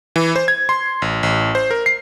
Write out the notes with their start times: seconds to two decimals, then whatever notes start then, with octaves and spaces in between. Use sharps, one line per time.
0.16 E3
0.36 C5
0.48 G#6
0.69 C6
1.02 A1
1.23 A1
1.55 C5
1.71 A#4
1.86 C7